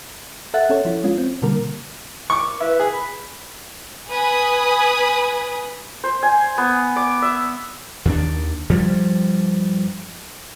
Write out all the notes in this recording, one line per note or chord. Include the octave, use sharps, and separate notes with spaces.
A4 E5 F#5 F#6 A6
C#4 A4 C#5
F3 E4
G#3 C#4 F4
C4
B2 D3 G3 A#3 A#4
C#6 D6
E4 B4
G#4
B5
B4 G#5 B5 D#6
C5
G#5
B3
D6
E5
D#2 D#3 D4
G2 F3 G3